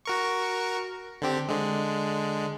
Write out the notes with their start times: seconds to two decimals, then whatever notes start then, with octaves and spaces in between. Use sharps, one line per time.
0.05 F#4 A#4 C#6
1.22 D3 C4 G4
1.49 D3 G#3